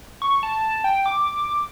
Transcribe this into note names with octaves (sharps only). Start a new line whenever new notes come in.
C#6
A5
G5
D6